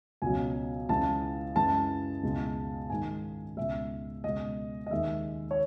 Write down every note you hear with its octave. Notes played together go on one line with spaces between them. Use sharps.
C#2 B2 F#3 G#5
C#2 C#3 E3 G#3 A5
F#2 E3 G#3 A5
C#2 B2 G#3
G#2 D#3 G#3 G#5
C#2 B2 G#3 E5
C#2 B2 G#3 D#5
D#5
D#2 D#3 G#3 E5
C#5